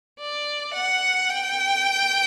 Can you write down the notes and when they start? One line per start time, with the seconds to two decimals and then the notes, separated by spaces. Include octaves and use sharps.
0.19 D5
0.74 F#5
1.30 G5